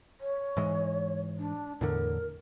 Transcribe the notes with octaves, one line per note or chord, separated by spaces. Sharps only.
C#5
G#2 E3 G#3
D4
E2 A2 D3 A#4